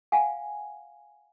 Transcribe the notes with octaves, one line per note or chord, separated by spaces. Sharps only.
F5 F#5 G#5